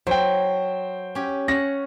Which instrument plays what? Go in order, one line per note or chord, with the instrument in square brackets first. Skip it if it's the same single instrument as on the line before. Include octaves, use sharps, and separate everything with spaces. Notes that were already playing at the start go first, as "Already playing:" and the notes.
[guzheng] F#3 [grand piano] C5 G5
[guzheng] C#4 G4
[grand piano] C#4 A#6 [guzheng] F#5